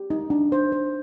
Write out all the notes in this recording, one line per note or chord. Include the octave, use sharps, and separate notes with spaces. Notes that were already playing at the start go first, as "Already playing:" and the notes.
Already playing: G4
D#4
D4
C5
C5